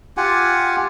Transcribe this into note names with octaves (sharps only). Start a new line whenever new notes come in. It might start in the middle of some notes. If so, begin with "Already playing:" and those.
F4 G4 F#5 G#5